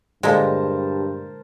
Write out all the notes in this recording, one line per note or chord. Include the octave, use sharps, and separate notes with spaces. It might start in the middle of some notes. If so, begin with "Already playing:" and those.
G2 A#2 D3 G#3 A#4 C5 A5